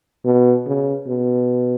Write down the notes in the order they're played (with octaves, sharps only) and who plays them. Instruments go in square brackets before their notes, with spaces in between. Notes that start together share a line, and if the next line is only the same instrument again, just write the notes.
[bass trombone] B2
C#3
B2